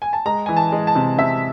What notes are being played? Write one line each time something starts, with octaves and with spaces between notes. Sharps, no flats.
G#5
A5
G#3 A#5
E3 G#5
A5
G#3
A5
C3
C3 E5